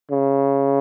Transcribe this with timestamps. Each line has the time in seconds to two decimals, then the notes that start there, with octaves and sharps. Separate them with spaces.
0.11 C#3